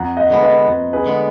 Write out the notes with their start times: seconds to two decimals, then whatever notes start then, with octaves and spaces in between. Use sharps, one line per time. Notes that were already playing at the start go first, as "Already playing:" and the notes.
Already playing: F2 F#5 A#5
0.17 D#5 F#5
0.30 D3 G#3 B3
0.43 B4 D#5
0.68 F2
0.93 G#4 B4
1.06 D3 G#3 B3